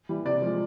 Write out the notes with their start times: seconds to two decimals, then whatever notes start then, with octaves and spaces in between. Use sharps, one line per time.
0.09 E3 G3
0.25 C3 D5
0.42 F3 G#3